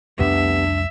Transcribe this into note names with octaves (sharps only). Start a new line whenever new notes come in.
C2 F2 A3 B3 D4 G4 E5